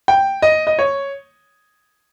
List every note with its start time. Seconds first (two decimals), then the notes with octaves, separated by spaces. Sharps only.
0.08 G5
0.42 D#5
0.67 D#5
0.79 C#5